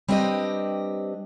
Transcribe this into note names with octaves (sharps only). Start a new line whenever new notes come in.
G3 C4 D4 G4 B4 D#5